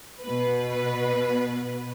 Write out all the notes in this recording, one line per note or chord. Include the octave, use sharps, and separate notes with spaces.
B2 B4